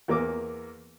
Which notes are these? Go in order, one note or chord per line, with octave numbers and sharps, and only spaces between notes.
E2 A#3 A#4 D6